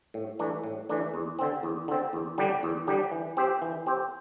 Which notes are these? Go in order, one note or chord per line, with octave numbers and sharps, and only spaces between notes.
A2
E3 A3 D4
A2
E3 A3 D4
E2
D3 C4
E2
D3 C4
E2
D3 G3 D4 G4
E2
D3 G3 D4 G4
E3
C4 G4 C5
E3
C4 G4 C5